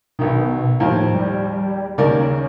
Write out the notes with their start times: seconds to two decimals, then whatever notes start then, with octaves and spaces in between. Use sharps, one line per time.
0.19 B1 B2 D#3
0.80 D#2 A2 F3
1.14 G3
1.98 D#2 C#3 A#4 D5